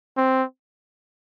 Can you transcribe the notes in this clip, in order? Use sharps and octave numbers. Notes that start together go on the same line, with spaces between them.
C4